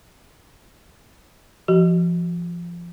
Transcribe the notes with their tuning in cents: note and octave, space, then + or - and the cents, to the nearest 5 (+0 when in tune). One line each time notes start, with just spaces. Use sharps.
F3 -20 F#4 +35